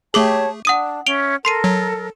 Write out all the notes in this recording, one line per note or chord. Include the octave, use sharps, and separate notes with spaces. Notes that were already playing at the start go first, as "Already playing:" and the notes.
A3 G4 G#4 C#5 A5 D6 F#7
D4 F#5 D#6 D#7
C#4 E5 D7 F7 G7
A4 A#4 C6 C7 D#7
F#3